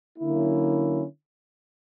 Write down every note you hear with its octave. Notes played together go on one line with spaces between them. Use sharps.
D3 F#3 A#3 C#4 E4